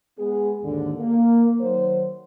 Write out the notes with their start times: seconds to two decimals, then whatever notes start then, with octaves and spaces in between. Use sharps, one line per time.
0.18 G#3 B3 G#4
0.63 D#2 G#2 D3
0.99 A#3
1.60 D#3 F#3 C5